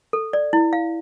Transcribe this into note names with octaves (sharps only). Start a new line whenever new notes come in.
A4
D5
E4
F5